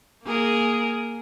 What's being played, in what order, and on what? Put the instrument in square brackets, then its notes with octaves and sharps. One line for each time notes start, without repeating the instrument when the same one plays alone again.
[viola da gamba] A#3 G#4 A#4